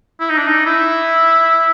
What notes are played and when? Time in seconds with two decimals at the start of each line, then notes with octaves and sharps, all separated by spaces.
0.20 E4
0.30 D#4
0.38 D4
0.48 D#4
0.66 E4